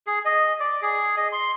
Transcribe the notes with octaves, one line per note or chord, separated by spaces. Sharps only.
G#4
D#5
D5
G#4
D#5
C6